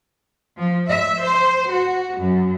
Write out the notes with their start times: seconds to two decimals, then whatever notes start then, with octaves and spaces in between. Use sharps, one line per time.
0.57 F3
0.89 E5
1.23 C5
1.72 F#4
2.18 F#2